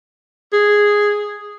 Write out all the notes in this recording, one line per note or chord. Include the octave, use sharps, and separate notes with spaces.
G#4